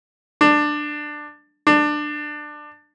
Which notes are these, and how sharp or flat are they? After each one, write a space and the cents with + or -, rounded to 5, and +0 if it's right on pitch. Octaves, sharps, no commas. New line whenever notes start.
D4 +15
D4 +20